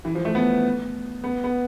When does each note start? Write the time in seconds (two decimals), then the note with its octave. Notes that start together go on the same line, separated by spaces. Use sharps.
0.05 E3
0.15 F3
0.25 A3
0.35 B3
1.24 B3
1.44 B3